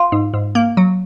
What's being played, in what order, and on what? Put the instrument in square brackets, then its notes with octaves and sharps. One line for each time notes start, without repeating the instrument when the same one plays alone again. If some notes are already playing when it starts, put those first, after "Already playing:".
Already playing: [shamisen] F4
[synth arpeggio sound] G#2
G#2
A#3
F#3